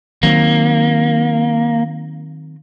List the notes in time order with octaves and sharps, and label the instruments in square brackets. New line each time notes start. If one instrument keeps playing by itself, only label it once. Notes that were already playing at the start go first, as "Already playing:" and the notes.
[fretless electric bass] D#3 F#3 C4 [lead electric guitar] A#3